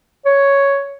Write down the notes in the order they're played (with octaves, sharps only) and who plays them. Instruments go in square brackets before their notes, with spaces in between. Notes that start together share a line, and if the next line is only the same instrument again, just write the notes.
[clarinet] C#5